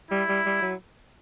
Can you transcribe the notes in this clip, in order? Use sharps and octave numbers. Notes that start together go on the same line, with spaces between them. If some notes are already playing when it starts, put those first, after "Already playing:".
G3 E4
G3
G3
F#3